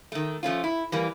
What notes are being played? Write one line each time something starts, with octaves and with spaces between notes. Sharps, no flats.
D#3 A3
F3 A3 C#4 F4
E4
E3 G3 A#3